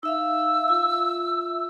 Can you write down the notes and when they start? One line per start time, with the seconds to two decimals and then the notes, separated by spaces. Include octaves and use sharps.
0.03 D#4 E5 F5 E6
0.68 F4 E5